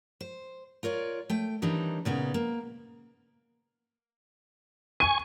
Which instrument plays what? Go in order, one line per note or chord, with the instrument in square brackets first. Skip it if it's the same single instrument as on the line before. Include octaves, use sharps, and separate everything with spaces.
[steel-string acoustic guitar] C5
F4 A#4 C#5 D5
A3 G5
D#3 E3 G3 C4 D4 D#4
A#2 C#3 B3 D#4
A#3
[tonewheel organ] G#5 C#6 [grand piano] D#7